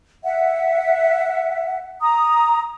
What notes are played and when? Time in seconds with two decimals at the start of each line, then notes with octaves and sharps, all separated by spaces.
0.24 E5 F#5
2.01 A#5 D#6